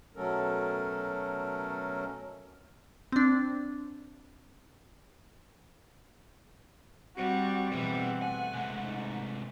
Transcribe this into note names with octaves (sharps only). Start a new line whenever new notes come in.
B2 F#3 A3 C#4 A4 A#4
C4 D4
G3 C4 F#4
B2 E3 G3 G#4 C5 F#5
A3 G#5
C3 G#3
G#2